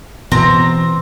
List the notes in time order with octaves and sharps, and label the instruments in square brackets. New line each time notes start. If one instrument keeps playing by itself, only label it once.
[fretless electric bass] B2 E3 B3 [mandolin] C4 A#5